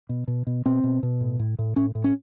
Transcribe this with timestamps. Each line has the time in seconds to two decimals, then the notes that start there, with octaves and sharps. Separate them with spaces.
0.09 B2
0.28 B2
0.47 B2
0.66 B2 C4
0.84 B2
1.03 B2
1.21 A2
1.39 A2
1.59 A2
1.76 A2 C#4
1.95 A2
2.04 C#4